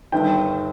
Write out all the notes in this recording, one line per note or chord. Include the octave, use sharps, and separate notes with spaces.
G1 G2 D#3 G5